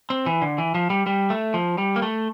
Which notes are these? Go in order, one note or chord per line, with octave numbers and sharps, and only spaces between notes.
C4
E3
D3
E3
F3
G3
G3
A3
F3
G3
A#3
A3